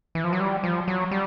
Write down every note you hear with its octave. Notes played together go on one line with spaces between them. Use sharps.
E3
F3
F#3
G3
F3
F#3
G3